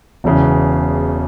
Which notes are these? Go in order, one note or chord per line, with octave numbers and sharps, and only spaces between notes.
E1 E2 C#3 E3